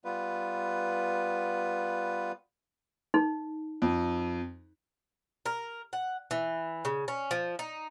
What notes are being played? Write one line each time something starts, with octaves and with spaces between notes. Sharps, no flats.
G3 B3 F4 B4
D#4
F2
A#4
F#5
E3
C#3
C#4
F3
D#4